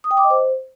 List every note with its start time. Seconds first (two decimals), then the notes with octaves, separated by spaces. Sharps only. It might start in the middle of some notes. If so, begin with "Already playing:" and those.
0.04 D#6
0.11 G5
0.17 D6
0.24 D#5
0.30 C5